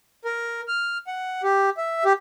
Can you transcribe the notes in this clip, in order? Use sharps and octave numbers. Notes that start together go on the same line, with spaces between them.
A#4
F6
F#5
G4
E5
G4